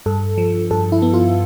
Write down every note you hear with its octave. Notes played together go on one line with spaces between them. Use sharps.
G2 A4
F3
G2 A4
E4
B3
F4